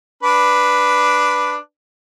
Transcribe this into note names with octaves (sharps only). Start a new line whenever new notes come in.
D4 B4